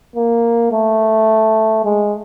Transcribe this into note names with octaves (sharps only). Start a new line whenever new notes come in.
A#3
A3
G#3